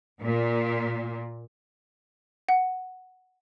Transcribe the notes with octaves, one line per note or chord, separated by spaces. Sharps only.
A#2
F#5